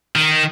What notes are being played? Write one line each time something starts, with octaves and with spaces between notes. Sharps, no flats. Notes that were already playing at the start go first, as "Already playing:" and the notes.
D#3